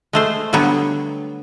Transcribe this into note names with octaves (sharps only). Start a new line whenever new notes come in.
G#3 A3 C5
D3 F#3 G3 B3 C#5